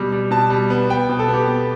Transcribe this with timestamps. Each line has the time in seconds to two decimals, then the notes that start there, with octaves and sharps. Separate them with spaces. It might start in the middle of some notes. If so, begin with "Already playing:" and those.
Already playing: B2 G3
0.12 G3
0.31 B2 A5
0.50 G3
0.70 B3
0.90 B3 G5
1.09 B2
1.19 A4
1.28 B3
1.33 G4
1.48 B3